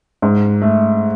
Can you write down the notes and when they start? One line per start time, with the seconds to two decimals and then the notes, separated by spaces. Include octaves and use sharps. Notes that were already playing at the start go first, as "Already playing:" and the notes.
0.22 G#2
0.62 A3